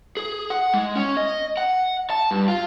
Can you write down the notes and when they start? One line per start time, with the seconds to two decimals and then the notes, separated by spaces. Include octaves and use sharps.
0.17 G#4
0.50 F#5
0.74 G#3
0.95 C#4
1.17 D#5
1.57 F#5
2.10 A5
2.31 G2
2.48 F4